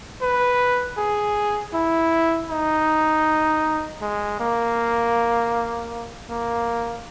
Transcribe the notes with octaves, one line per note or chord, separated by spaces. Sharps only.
B4
G#4
E4
D#4
G#3
A#3
A#3